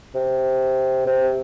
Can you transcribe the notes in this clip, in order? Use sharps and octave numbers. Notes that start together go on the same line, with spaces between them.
C3
C3